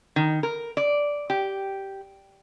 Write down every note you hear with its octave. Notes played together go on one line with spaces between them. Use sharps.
D#3
A#4
D5
G4